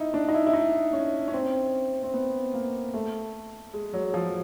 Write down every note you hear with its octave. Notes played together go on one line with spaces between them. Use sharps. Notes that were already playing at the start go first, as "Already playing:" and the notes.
Already playing: D#4 E4
D4
D#4
E4
E4
D#4
C#4
C#4
C4
C4
B3
A#3
A3
G#3
F#3
F3